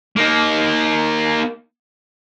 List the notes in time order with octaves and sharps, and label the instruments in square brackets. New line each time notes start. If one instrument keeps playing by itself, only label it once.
[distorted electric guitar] A#3 D#4